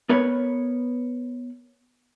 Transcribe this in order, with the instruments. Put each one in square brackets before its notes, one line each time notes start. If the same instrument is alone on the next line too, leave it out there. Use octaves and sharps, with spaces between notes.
[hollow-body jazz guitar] B3 A#4 B4 C#5